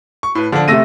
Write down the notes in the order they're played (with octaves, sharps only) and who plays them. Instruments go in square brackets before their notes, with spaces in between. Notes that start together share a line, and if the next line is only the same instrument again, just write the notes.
[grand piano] C#6
A2 B4
[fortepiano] D3 [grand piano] F3 D4
[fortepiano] C3 A3 [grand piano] E6 A#6 D#7